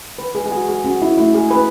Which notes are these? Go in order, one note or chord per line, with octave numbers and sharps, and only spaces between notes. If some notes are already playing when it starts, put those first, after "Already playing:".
E3 B4
G#4
G#4
E3 F#4
G#4
C#4 F#4
E4
A3 E4
G#4
C#4 B4